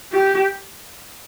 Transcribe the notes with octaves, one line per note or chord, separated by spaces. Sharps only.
G4